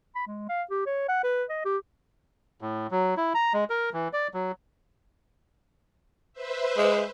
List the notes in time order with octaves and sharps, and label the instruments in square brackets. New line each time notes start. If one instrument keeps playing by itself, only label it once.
[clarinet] B5
G#3
F5
G4
C#5
F#5
B4
D#5
G4
[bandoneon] A2
F#3
E4
A#5
G#3
A#4
E3
D5
F#3
[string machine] B4 C5 E5
[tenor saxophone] G#3